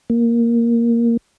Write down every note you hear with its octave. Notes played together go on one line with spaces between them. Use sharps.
A#3